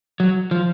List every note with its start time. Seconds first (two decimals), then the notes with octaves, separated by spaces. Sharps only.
0.20 F#3
0.51 F3